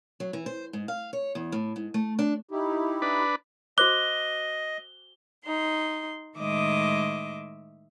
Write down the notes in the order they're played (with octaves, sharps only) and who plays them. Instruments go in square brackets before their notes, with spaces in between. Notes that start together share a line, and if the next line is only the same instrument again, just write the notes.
[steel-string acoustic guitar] F#3
E3
C5
G#2
F5
C#5
E2
A2
G#2
A3
D4
[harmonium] D#4 E4 G4
[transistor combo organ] D4 B4
[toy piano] F#4 C5 D6 [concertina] D#5 [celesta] F#6 [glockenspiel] G7
[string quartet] D#4 C6
A2 D#3 G#3 D#5 E5 D6